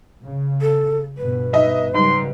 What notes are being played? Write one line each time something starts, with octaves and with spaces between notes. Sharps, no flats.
C#3
A4
G2 B2 B4
D#4 D#5 E5
G#2 C#3 F#3 G3 C6